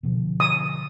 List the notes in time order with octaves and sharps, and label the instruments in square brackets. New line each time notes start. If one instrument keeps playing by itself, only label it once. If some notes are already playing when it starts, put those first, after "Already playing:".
[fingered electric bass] B2 D3 F3
[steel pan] D#6